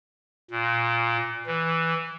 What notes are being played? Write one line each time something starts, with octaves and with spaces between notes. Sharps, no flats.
A#2
E3